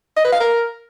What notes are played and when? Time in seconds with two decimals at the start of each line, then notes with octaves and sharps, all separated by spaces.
0.17 D#5
0.25 B4
0.32 F5
0.40 A#4